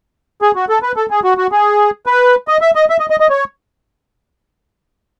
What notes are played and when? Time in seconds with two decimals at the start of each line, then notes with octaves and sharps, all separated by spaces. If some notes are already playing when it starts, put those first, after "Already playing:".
0.42 G#4
0.56 F#4
0.69 A4
0.82 B4
0.96 A4
1.10 G#4
1.24 F#4
1.38 F#4
1.52 G#4
2.06 B4
2.48 D#5
2.61 E5
2.75 D#5
2.90 E5
3.00 D#5
3.10 D#5
3.20 D#5
3.30 C#5